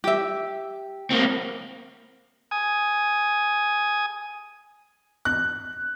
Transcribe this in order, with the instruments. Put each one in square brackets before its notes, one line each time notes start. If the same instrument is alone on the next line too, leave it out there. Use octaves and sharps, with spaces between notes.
[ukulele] G4 E5
[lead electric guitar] A#3 C4
[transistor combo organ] G#5 D#6
[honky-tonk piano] F#6